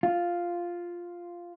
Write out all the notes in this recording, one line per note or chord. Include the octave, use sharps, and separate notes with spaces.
F4